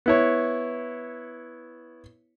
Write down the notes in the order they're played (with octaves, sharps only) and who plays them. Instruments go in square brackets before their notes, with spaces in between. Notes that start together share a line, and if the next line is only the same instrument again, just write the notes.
[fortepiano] B3 E4 C#5